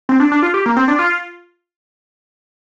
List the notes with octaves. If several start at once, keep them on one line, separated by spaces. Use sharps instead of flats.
C4
D4
D4
F4
G4
A#3
C4
D4
F4